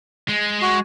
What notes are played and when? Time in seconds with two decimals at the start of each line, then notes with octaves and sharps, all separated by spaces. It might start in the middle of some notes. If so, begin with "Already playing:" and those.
0.28 G#3
0.62 F#4